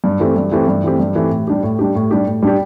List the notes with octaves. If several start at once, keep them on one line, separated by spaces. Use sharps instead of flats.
G2
E3 A3 C4 G4
G2
E3 A3 C4 G4
G2
E3 A3 C4 G4
G2
E3 A3 C4 G4
A2
G3 D4 G4
A2
G3 D4 G4
A2
G3 D4 G4
A2
G3 D4 G4